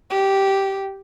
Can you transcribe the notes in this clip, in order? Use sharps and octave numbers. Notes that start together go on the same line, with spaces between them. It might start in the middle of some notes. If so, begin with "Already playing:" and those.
G4